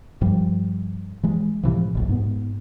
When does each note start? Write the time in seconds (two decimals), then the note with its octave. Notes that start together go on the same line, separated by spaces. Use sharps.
0.21 G2 F3 G3
1.23 E3 G#3
1.63 A2 C3 E3 F3
1.95 E1 A#1 F#2
2.09 G#2 B3